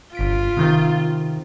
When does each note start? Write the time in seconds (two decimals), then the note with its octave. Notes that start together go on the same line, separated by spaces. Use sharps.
0.15 G1 F4 B6 D7
0.57 C3 D#3 C4